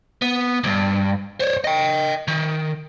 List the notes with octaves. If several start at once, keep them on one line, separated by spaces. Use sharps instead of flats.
B3
C#2 G2
C5 C#5
D#5 G5
D#3